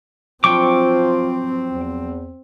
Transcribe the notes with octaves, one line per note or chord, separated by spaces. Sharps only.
F3 F#3 C4 D4 F4 G5 C#6 D6
E2